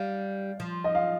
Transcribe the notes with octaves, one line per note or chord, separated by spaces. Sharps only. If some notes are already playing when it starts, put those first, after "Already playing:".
Already playing: G3 F5
F3
D#5
F5